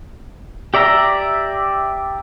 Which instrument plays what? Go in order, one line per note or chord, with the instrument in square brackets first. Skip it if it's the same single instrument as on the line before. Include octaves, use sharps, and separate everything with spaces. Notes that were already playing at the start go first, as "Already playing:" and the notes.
[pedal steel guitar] G4 D5 E5 A#5